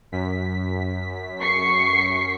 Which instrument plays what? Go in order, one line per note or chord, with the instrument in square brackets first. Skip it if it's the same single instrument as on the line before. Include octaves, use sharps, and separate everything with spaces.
[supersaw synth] F#2 B6
[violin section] C#6 C7 C#7